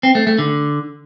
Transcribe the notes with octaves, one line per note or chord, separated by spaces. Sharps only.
C4
A3
A3
D3